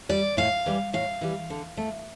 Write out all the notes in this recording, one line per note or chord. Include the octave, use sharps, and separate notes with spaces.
G3 D5
A2 F5
E3 G3
A2 F5
E3 G3
D3
A3